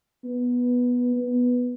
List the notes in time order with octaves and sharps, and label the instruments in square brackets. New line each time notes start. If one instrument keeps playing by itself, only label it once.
[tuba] B3
B3